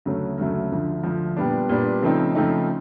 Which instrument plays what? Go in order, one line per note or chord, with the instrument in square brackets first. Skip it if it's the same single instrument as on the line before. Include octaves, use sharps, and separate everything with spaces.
[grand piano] D2 C#3 F#3 A3
D2 C#3 F#3 A3
D2 D3 F3
D2 D3 F3
A#2 G3 B3 D4
A#2 G3 B3 D4
C#3 F3 A3 C4 D#4
C#3 F3 A3 C4 D#4